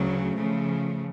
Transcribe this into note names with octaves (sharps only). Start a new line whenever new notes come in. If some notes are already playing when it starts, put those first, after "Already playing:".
Already playing: D2 C#3 F#3
C#3 F3 A3